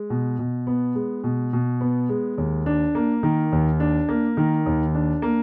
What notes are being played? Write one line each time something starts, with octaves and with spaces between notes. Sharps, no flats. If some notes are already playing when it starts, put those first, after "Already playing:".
Already playing: G#3
B2
B2
B3
G#3
B2
B2
B3
G#3
D#2
D4
A#3
D#3
D#2
D4
A#3
D#3
D#2
D4
A#3